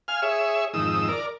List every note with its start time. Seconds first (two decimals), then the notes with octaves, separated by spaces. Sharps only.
0.08 F5 G#5 F6
0.22 G#4 C#5 E5
0.73 F2 G#2 D#3 D#6 E6
1.08 A#4 D5